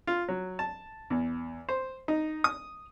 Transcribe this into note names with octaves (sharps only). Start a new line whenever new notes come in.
F4
F#3
A5
E2
C5
D#4
D#6